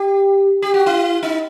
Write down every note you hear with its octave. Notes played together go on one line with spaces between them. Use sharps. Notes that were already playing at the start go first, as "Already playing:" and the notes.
Already playing: G4
G4
F#4
E4
D#4